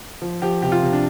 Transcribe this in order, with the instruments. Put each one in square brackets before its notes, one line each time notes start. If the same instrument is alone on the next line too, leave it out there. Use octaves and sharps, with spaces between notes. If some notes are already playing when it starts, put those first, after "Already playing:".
[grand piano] F3
F3 G4
C3 G4
F4
C3
D4